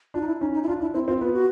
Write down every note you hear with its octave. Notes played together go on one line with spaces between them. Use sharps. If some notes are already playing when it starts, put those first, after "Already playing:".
D4 F4
D#4
E4
C#4 D#4
D#4
E4
D4 F4
D4 E4
C4 E4
C4 F4
B3 F4
F#4